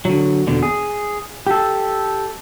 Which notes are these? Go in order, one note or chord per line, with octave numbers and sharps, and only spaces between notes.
D3 F#3
E2 B2 D3
G#4
G4 A4